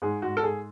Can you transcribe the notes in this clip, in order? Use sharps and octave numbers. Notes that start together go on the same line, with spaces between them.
G#2 G#4
G#2 F#4
A4
G#2 G#4